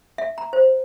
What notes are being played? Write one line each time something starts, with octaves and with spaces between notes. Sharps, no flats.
E5
A#5
C5